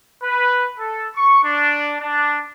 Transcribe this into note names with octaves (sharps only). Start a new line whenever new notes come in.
B4
A4
C#6
D4
D4